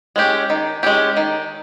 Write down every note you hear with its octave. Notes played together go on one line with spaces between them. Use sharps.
G#3 C#4 G4
D#3
G#3 C#4 G4
D#3